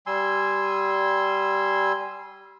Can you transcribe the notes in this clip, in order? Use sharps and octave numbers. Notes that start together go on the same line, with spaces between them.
G3 G#5 C6 E6